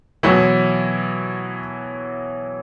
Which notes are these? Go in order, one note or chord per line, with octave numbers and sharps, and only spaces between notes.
B2 E3 F#3 E4